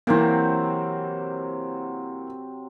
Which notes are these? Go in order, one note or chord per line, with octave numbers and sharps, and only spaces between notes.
C3 E3 F#3 A#3 C4